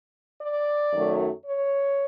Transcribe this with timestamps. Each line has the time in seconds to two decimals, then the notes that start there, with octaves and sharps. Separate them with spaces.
0.39 D5
0.92 F#2 D#3 F#3 A3
1.45 C#5